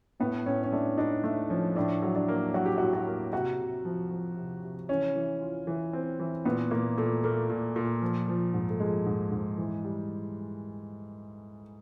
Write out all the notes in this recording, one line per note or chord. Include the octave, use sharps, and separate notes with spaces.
A2 B3
A2 C#4
C#4
A3 D4
D4 D#4
A3
F3 C#4
A2 D4
F#3
D4
A#3
F#3 F#4
G4
A2 F#4
F#4
A#3
C3 F#4
C3
F3
F3
C3
C3
E3 C#4
E3
F4
E3
C4
E3
A#2 B3
A#2 A#3
A#2 A3
A3 A#3
A#2
A#2
F3
F3
G#2
A3
F3 G#3
G#2
G#2
E3
G3